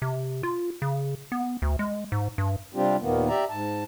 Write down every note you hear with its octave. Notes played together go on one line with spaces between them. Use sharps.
C3
F4
C#3
B3
D2
G#3
G#2
G2
C3 G3 C4 D4 F4 G4
D#2 A#2 D#3 A#3 B3
G4 D5 E5 A#5
G#2 A5